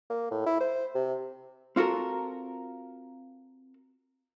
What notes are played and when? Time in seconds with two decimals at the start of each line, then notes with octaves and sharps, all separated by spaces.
0.10 A#3
0.31 A2
0.46 E4
0.60 C5
0.95 C3
1.76 C4 F4 F#4 A4 A#4